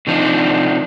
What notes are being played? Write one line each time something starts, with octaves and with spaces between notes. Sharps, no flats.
C3 F3 D4 D#4